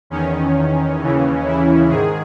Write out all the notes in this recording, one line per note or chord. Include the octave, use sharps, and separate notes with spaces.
E2 D#3 C#4
D#2 C#3 E3
E4
G#2 D#3 G#4